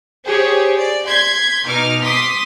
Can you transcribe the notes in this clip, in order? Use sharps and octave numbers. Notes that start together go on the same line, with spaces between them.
G4 G#4 C5 C#5
D5
C6 G6 G#6 B6
B2 D#4 D6 F6
C6 D6 D#6 B6